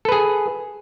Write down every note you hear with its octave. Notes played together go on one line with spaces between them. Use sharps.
G#4 A4 B4